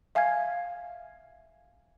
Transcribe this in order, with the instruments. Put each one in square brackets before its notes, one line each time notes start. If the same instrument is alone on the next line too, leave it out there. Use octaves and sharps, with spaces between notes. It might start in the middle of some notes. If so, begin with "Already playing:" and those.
[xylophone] E5 F5 G#5 F6 G#6